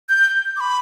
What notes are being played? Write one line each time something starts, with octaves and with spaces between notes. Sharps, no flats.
G6
D6
B5